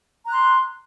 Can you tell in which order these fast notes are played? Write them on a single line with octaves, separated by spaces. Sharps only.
A#5 F#6 C6